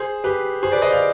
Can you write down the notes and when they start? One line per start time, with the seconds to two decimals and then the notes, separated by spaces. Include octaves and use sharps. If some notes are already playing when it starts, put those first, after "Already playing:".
Already playing: G#4 C5
0.24 G4 B4
0.63 G#4 C5
0.72 B4 D5
0.82 C5 D#5
0.92 D5 F5